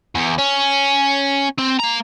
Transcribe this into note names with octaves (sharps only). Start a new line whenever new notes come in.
E2
C#4
C4
A#3 A#5